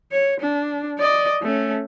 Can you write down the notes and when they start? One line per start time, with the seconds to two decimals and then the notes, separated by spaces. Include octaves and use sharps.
0.11 C#5
0.40 D4
0.99 D5 D#5
1.42 A3 C#4